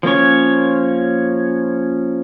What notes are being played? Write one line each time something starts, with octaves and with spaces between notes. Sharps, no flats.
F3 A#3 C#4 C#5